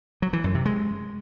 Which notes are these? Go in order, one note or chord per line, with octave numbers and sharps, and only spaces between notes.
F#3
E3
F#2
C3
G#3